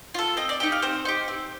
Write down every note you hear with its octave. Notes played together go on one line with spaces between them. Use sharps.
F4 A4
C4 D#5
D5
D#4 G4 D#5
F5
C4 C5
D#4 G4
C4